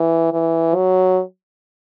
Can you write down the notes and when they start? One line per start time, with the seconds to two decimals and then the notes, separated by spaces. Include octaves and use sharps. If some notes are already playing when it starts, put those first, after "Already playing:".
Already playing: E3
0.33 E3
0.75 F#3